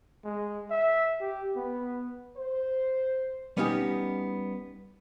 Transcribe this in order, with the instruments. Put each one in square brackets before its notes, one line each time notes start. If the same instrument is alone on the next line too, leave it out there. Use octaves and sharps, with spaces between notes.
[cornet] G#3
E5
G4
B3
[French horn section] C5
[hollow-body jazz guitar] G3 B3 C#4 D#4 G4